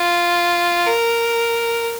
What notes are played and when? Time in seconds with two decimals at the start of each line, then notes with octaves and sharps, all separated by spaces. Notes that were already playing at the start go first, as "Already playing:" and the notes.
Already playing: F4
0.86 A#4